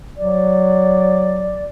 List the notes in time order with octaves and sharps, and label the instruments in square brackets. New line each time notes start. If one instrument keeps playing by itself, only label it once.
[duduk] F#3 [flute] D5